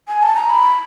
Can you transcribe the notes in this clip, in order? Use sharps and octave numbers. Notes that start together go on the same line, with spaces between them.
G#5
A5
A#5
B5